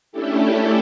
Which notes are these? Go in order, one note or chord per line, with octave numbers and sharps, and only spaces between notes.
A3 C#4 D4 E4 G4 A4